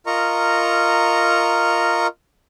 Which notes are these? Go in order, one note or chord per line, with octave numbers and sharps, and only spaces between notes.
F4 A#4 D#5 A#5 C#6